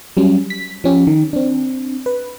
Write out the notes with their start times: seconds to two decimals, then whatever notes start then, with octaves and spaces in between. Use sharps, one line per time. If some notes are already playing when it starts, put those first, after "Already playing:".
0.17 F#3 G3 C#4
0.50 B6
0.84 F3 C#4 G4
1.07 D#3
1.33 C4 D4
2.06 B4